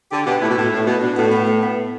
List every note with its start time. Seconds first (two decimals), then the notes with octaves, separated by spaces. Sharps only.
0.11 D3 G4
0.26 B2 G4
0.42 A2 E4
0.49 B2
0.58 A2
0.72 A2
0.86 B2
1.02 B2 D4
1.16 A2 B3
1.32 B3
1.46 A3
1.62 B3